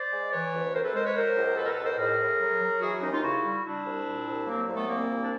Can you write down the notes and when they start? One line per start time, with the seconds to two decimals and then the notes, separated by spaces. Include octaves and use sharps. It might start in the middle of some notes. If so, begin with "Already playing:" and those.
Already playing: C5 D5
0.11 G#3
0.32 E3 B4 C#5
0.52 D2
0.73 C3 A#4 C5
0.83 A4 B4
0.94 G#3 A#4 C5
1.05 B4 C#5
1.15 F#3 A#4 C5
1.35 C#2
1.45 A#4
1.56 B2 A4 B4
1.64 A#4
1.70 A4 B4
1.77 C#2
1.84 A#4 C5
1.91 B4
1.97 A2 G#4 A#4
2.19 A2
2.40 F#3
2.60 F#3
2.81 E3 F#4 G#4
3.01 D#2 C#4 D#4
3.12 D#4 F4
3.22 C#3 E4 F#4
3.43 G3
3.64 G3 D4 E4
3.85 C2
4.05 A#2
4.27 C2
4.47 F#3 A#3 C4
4.68 C2
4.75 A3 B3
4.88 A#2 A#3 C4
5.10 C2
5.22 D4